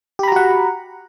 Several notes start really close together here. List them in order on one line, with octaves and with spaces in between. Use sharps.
G4 B5 A#5 F#4 F#5